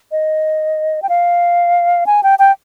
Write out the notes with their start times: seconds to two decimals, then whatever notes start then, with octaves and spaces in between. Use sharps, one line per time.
0.12 D#5
1.02 G5
1.09 F5
2.06 G#5
2.23 G5
2.39 G5